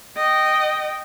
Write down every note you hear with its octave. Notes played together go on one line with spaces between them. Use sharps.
D#5 G5